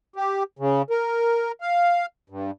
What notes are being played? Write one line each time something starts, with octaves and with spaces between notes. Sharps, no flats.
G4
C#3
A#4
F5
G2